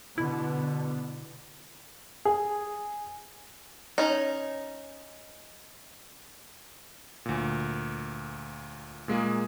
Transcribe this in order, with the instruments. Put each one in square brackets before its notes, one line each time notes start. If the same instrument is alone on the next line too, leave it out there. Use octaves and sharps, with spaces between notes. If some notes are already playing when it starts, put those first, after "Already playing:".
[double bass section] B2 D3 B3 [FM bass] E4
[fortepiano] G#4
[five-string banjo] C#4 D#4
[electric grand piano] D2 A#2
A#2 G#3 A#3 G#4